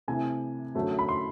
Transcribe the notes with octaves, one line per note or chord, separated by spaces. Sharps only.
C3 E3 A3 G#5
F#2 D3 F#3 A3
B5
C6